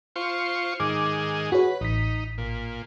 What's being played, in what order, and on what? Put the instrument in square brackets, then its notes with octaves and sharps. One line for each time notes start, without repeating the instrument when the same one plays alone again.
[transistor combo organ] F4 C5 C#6
[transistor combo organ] G#2 D#3 G#4 [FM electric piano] D6
[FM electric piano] F#4 G#4 C#5 [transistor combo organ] B4
[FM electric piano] A1 B6 [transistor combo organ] D#4
[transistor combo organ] A#2